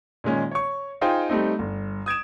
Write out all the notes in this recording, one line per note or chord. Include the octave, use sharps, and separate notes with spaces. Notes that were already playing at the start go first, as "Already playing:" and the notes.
A#2 D#3 G#3 C#4
C#5 C#6
D#4 F4 G#4 C5 G5
G3 A3 C4 D#4
G1
D#6 G#6 D7 E7